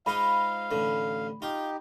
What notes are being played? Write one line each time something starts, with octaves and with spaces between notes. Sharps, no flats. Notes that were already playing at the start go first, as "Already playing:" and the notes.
G#2 D#4 F4 F5 B5
A1 D3
D#4 F4 G4